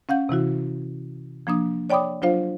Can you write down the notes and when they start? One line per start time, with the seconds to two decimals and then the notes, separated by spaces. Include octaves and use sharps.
0.09 C#4 F5 F#5 G6
0.29 C3 E3 E4 F#4
1.47 F3 A#3 D4 D#6
1.90 C#5 D5 G5 B5 D6 D#6
2.22 F#3 D4 F4 C5 F5